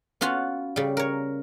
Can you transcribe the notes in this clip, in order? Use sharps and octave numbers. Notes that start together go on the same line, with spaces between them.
B3 C#4 F4 F#4 C#5
C#3 G3
A#4 C#5